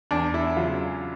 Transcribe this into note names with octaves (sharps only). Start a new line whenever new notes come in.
E2 D4
E4
C#3 F#3 F4